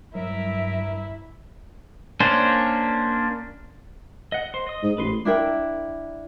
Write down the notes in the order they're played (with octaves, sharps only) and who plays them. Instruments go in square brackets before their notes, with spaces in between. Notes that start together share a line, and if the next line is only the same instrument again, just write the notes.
[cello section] G2 E5 [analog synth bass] F#3 [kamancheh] E4 [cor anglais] A#4
[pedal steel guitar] A#3 C#4 D4 C5
D#5 F#5
C5 C6
D#5 D#6
[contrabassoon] G#2
[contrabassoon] A1 [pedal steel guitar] B4 C6
[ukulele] D4 E4 A#4 G5